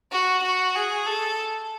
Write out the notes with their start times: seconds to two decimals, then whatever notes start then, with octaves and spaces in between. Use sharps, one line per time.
0.12 F#4
0.43 F#4
0.75 G#4
1.06 A4